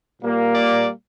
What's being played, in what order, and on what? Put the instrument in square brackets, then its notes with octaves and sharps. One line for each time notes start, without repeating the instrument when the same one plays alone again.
[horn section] A#2 G3 A#3
D5